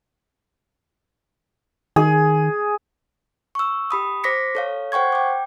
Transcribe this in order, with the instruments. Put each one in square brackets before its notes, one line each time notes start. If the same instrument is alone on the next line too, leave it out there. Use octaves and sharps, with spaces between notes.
[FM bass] D#3 [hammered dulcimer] G#4
[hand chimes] C#6 E6
G4 B5 D#6
C5 D6 A#6 B6 C#7
A4 C#5 F5
C5 F#5 G5 C#6 G#6
G5 D6